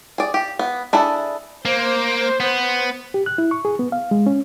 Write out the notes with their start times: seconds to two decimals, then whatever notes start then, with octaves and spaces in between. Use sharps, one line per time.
0.18 G#4 D5
0.34 G4
0.59 B3
0.93 D4 E4 G#4 A4
1.65 A#3 C5
2.40 B3
3.14 G4
3.26 F#6
3.38 E4
3.51 C#6
3.65 G#4
3.79 B3
3.92 F5
4.11 G#3
4.26 C#4